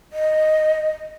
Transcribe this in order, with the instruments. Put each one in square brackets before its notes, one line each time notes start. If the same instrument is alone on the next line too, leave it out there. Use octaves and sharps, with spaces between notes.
[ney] D#5